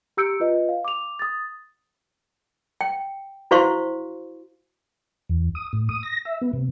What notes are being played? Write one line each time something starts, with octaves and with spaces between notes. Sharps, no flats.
G4 A#5 E6 G6 C#7 D7
F4 B4 D#5
F5
D6 F7
D#6 A6
G5
E4 F#4 C5 F5 C6 C#6
E2
D#6
A2
D#6
A#6
E5
B3
C3